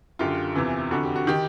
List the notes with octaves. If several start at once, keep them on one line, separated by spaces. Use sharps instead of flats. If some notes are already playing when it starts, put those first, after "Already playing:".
F#2 D3 F4 G4
E2 C3 E3
F2 D3 F#4
G4
F#4
D#3 G4